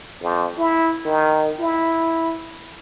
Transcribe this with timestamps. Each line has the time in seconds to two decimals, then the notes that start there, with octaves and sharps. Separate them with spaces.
0.22 F2
0.58 E4
1.05 D#3
1.60 E4